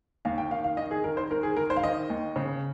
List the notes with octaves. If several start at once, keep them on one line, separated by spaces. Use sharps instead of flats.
D#2 F5
G5
D#3 F5
F5
D#3 D#5
G#4
D#3 A#4
C5
D#3 A#4
G#4
D#3 A#4
C5
F5
D#3 D#5
D#2
C#3